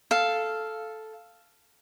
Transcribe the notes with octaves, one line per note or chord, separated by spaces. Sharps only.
A4 F5